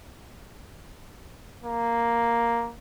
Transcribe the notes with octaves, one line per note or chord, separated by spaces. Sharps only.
A#3